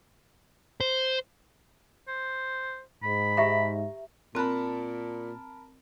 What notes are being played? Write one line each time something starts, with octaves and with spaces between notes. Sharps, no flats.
C5
C5
G#2 B5
G4 E5 A#5
A#2 C4 A#4 A5 B5 F#6